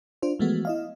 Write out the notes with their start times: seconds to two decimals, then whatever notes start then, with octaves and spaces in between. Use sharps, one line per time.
0.22 D4 F4 C5
0.39 E3 F3 G#3 A3 B3 F#4
0.65 E4 D#5 F5